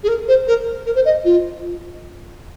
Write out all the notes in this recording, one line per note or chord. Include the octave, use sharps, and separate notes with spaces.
G#4
A#4
C5
A#4
A#4
C5
D#5
F4